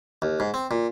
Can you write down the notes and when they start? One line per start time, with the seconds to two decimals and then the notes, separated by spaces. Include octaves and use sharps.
0.22 D#2
0.40 G#2
0.54 C4
0.71 A#2